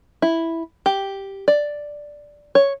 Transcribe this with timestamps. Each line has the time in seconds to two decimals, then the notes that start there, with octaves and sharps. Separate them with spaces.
0.22 E4
0.86 G4
1.48 D5
2.55 C#5